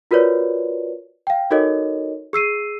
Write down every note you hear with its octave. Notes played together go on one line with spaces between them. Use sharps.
F4 F#4 A#4 B4 C#5 D5
F5 G5
D#4 F#4 A4 A#4 C#5 D#5
G#4 E6 C7 D#7